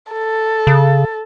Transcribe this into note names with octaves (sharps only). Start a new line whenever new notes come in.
A4
C#3